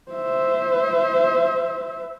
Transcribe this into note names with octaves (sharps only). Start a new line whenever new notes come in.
C5 E5